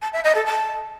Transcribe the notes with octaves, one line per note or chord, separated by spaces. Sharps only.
A5
E5
D#5
A4
A5